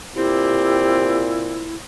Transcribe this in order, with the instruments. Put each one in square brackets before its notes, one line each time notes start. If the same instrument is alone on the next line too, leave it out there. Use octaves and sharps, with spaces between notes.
[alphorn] A#2 [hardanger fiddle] C4 [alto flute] E4 [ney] G4